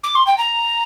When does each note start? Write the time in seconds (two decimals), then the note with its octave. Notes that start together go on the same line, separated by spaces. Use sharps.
0.04 D6
0.15 C6
0.27 G5
0.38 A#5